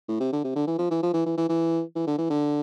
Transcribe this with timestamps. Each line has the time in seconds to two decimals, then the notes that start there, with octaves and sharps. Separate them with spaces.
0.09 A2
0.20 C3
0.33 D3
0.44 C3
0.55 D3
0.67 E3
0.78 F3
0.91 E3
1.03 F3
1.14 E3
1.26 E3
1.38 E3
1.49 E3
1.96 E3
2.07 D3
2.18 E3
2.30 D3